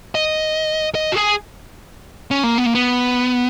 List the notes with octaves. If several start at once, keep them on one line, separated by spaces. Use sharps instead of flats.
D#5
D#5
F#4
G#4
C#4
A#3
B3
A#3
B3